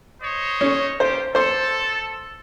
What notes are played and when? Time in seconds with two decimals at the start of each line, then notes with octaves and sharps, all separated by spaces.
0.21 C5 C#5 D#5
0.61 C#4
1.00 F4 G4 C5
1.35 A4 C5 C6